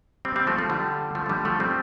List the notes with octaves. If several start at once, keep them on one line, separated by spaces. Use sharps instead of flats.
G3 C4
G3 C4
F3 A3
F3
D3 G3
F3 A3
A3
D3 G3
F3 A3
G3 C4